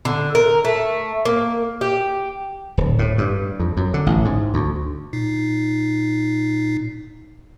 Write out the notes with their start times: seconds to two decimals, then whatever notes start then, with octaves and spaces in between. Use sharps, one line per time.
0.05 D3
0.35 A#4
0.65 A3
1.25 A#3
1.81 G4
2.77 D1
2.99 A2
3.18 G2
3.60 F2
3.77 F#2
3.94 D3
4.06 A1
4.25 G#2
4.54 D2
5.13 A#2 D#4 C7